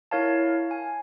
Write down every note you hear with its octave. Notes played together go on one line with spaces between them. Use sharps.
E4 A#4 C#5 F5 A5
G#5